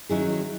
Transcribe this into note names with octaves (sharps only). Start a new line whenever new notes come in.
D#3 F#3 C#4 E4 G#4